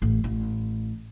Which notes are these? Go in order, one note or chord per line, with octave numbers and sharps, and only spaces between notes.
A1
A1